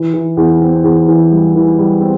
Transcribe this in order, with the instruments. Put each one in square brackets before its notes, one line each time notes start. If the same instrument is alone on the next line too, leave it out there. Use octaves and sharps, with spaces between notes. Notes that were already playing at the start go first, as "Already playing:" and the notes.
Already playing: [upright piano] E3
E3
E2
C4
E2
E3
G3
E3
G3
C4